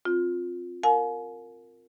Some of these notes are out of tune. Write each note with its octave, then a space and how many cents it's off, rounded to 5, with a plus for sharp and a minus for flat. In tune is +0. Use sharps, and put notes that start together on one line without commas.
C4 +0 F4 +15
A#4 -15 F5 +40 G#5 +35